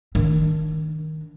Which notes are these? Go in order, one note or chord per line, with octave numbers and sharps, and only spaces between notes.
D#3 D4